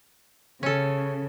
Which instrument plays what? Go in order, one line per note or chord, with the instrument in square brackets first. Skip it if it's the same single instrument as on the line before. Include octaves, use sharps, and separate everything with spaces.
[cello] C#3 [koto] C#4 A4